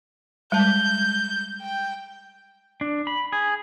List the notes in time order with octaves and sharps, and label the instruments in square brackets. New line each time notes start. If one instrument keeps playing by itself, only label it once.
[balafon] G3 G#3 A5 [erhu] G6
[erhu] G5
[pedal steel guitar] D4
B5
G#4